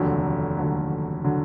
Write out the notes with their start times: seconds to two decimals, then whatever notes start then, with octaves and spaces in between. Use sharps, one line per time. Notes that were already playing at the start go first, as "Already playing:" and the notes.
Already playing: F1 D#2 D3 F#3
0.57 F1 D#2 D3 F#3
1.24 D3 F#3